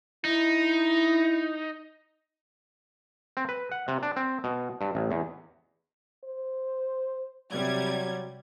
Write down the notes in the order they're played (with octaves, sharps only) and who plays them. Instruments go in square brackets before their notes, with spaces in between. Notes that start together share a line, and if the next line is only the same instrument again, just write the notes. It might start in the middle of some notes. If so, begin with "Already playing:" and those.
[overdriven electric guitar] D#4 [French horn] E4
[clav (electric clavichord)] C4
B4
F#5
C3
D4
C4
B2
G2
A1
E2
[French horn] C5
[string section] C3 G3 G#6 [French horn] F#3